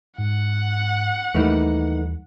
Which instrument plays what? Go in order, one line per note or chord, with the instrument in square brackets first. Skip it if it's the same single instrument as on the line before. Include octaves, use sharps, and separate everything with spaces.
[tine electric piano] G#2 [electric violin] F#5
[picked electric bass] D#2 G3 [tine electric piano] E3 [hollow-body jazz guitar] A3 A#3 D#4